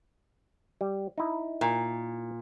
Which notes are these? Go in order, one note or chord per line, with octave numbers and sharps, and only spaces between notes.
G3
D#4 E4
A#2